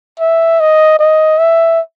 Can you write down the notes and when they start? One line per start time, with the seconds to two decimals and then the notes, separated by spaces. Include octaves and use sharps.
0.20 E5
0.60 D#5
0.99 D#5
1.39 E5